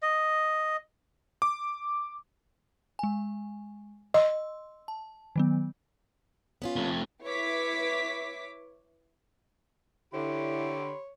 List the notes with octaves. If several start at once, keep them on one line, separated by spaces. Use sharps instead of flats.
D#5
D6
G#3 G#5
D#5 C6 E6
A5
D#3 F#3 B3
B3 C#4 F4
F2 A3
E4 B4 C#5 D6 B6
D3 E4 G4 C#5 B5 C6